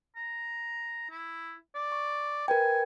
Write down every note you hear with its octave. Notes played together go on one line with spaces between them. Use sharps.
A#5
E4
D5
C#6
A#4 B4 G5 G#5